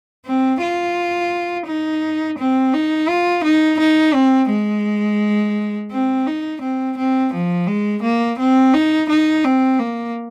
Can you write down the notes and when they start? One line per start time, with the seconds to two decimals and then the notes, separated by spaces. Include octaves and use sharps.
0.26 C4
0.62 F4
1.67 D#4
2.38 C4
2.74 D#4
3.09 F4
3.44 D#4
3.80 D#4
4.14 C4
4.50 G#3
5.91 C4
6.26 D#4
6.62 C4
6.98 C4
7.33 F3
7.67 G#3
8.03 A#3
8.39 C4
8.74 D#4
9.09 D#4
9.45 C4
9.79 A#3